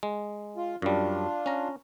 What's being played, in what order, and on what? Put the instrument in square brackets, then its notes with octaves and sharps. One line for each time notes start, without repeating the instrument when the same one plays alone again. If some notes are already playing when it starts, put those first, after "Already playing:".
[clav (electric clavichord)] G#3
[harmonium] F4
[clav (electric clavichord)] F#2 G3 [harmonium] D4 F4
[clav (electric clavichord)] C#4 A#5